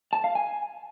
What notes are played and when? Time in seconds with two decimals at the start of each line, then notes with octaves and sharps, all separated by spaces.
0.13 A5
0.24 F5
0.35 G#5